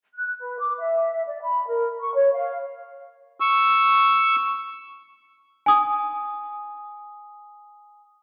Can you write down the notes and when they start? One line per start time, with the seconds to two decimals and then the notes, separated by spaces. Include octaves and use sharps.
0.15 F#6
0.40 B4
0.59 D6
0.79 E5
1.12 E5
1.27 D5
1.42 B5
1.67 A#4
2.01 C#6
2.15 C#5
2.34 F5
3.40 C#6 E6
5.66 G#5 D#6